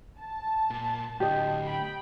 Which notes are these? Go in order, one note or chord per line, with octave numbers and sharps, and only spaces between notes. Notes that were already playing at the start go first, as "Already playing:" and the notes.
A5
A#2
A2 D3 G4 D#5
G5 B5